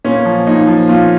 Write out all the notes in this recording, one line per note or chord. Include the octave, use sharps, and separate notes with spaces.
A#2 C#4
F3
A#2 D#4
F3
A#2 F4